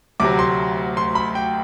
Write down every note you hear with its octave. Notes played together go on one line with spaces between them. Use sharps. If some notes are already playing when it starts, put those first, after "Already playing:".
D2 C3 F#3 D6
C6
C6
B5
G5